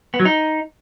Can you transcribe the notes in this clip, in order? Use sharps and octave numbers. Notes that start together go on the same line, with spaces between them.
B3
F#3
D#4